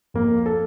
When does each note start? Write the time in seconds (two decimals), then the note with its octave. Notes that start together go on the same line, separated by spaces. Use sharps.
0.14 F2 A#3
0.46 A4